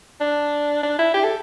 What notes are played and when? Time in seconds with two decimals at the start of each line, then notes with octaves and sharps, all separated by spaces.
0.21 D4
0.83 D4
0.99 E4
1.14 G4
1.24 A4